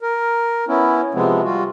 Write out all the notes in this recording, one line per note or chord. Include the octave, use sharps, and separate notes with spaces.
A#4
B3 C#4 E4
C3 F3 G#3 B3 C4
G3 F4 F#4